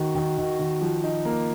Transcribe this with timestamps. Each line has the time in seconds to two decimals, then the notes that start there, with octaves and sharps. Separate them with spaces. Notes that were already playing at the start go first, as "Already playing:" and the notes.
Already playing: D#3 F#4
0.15 D#3
0.38 D#3
0.59 D#3
0.82 F3
1.03 D#4
1.25 A#3